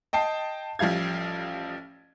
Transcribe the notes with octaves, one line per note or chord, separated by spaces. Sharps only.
D#5 G5 A5 C7
A1 F3 G3 F5 G#6